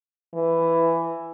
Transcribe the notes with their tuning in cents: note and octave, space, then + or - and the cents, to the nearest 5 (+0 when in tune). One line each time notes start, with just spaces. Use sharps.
E3 +10